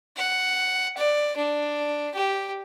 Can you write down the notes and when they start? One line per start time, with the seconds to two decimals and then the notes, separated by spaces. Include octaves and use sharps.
0.17 F#5
0.97 D5
1.36 D4
2.15 G4